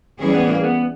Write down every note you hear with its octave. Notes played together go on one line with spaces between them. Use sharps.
E3 G3 C#4 G#4
B3
A#3
B3